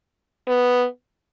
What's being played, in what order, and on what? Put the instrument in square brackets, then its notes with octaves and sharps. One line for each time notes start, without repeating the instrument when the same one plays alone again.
[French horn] B3